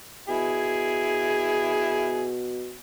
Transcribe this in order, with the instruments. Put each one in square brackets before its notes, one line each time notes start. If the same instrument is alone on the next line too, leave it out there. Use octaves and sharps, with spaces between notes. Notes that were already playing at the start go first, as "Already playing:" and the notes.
[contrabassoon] B2 [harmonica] E4 G#4